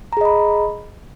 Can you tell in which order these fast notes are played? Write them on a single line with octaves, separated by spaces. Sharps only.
A#5 G#4 D#5 B5